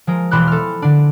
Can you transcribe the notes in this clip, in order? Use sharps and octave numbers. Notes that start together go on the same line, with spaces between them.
F3 G#3 A#4
E1 E3 B5 C6 D6 F#6
A4 F6
D3 D4